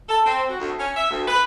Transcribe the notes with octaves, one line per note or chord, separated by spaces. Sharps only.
A4
C4
F#4
D2
C#4
E5
D2
B4